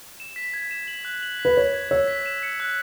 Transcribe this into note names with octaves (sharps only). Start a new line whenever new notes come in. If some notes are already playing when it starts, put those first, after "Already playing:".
E7
B6
G#6
E7
F#7
F#6
F#7
B6
B4
C#5 G#6
G#6
C#5 E6
B6
E7
C#7
F#6